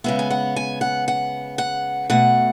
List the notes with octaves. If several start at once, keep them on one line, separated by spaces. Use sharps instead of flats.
C#3 G#3 B3 E5
G#5
F#5
G#5
F#5
F#5
F#5
B2 A3 F#5